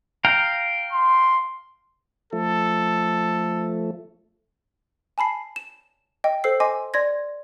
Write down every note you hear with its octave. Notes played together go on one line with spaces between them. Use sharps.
F5 G5 A#5
C6
F3 A3 A4
G#5 A5 B5 C7
E7
D#5 G5
A4 C5 E6 C7
D#5 G#5 C6 D6
D5 C6 G#6 A#6